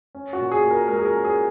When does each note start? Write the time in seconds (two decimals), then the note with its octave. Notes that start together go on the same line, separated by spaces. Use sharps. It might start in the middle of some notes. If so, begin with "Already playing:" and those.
0.15 C#4
0.33 F#4
0.39 A#2
0.52 G#4
0.64 A#2
0.70 A#4
0.88 G#3 A#4
0.96 G#4
1.05 A#4
1.13 C#4
1.25 G#4